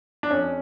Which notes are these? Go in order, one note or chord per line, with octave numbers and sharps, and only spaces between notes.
D4
F2 C#4